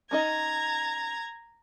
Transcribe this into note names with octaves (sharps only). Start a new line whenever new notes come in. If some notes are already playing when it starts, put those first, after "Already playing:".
C#4 D#4 D#5 A#5 G#6